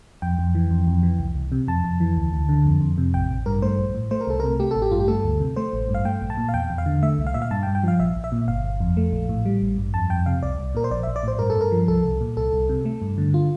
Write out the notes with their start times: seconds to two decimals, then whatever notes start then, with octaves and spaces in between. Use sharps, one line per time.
0.22 F2 G5
0.39 F2
0.55 E3
0.71 F2
0.87 F2
1.03 E3
1.19 C2
1.35 C2
1.52 C3
1.68 F2 A5
1.84 F2
2.00 E3
2.17 D2
2.33 D2
2.49 D3
2.65 F2
2.81 F2
2.98 C3
3.14 A1 G5
3.30 A1
3.46 G2 A#4
3.62 A3 C5
3.78 A#1
3.95 A2
4.11 A3 C5
4.21 A#4
4.27 C2 A4
4.40 C3 A#4
4.60 A3 G4
4.71 A1 A4
4.82 G4
4.91 G2 F4
5.00 G4
5.08 A3 A4
5.24 D2
5.40 C3
5.56 A3 C5
5.73 A1
5.89 G2
5.95 F5
6.05 A3 G5
6.21 A#1
6.30 A5
6.37 A#2
6.49 F5
6.54 E2 G5
6.70 E2
6.78 F5
6.86 D3
7.02 A3 E5
7.18 C2
7.27 F5
7.34 A#2 E5
7.42 F5
7.51 G2 A5
7.63 G5
7.67 G2
7.75 G5
7.84 F3 F5
8.00 A#1 E5
8.16 A#1
8.24 E5
8.32 A#2
8.48 G1 F5
8.64 G1
8.80 F2
8.97 A3
9.13 A#1
9.29 A2
9.45 G3
9.62 A1
9.78 G2
9.94 F2 A5
10.10 F2 G5
10.26 C3 F5
10.43 C2 D5
10.58 C2
10.75 A#2 A#4
10.84 C5
10.91 A#1 D5
11.03 E5
11.07 A#1
11.16 D5
11.23 A2 C5
11.39 G2 A#4
11.50 A4
11.56 G2 A#4
11.72 F3
11.88 C2 A4
12.04 C2
12.21 A#2
12.37 C2 A4
12.53 C2
12.69 C3
12.85 A3
13.02 G2
13.18 D3
13.34 F4